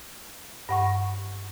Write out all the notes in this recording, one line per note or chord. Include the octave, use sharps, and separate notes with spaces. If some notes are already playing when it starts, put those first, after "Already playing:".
G2 F#5 C#6